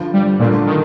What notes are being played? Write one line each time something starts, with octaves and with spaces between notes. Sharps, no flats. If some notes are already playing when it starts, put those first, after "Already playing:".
Already playing: G2 D3 F3
G3
A#2 D3 A3 D4 F4
D#3